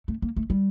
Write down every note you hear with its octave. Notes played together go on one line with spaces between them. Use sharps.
A3
A#3
A3
G3